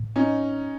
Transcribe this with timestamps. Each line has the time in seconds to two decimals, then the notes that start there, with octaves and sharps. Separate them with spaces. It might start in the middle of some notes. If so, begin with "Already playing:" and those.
Already playing: A2
0.16 C#4 D#4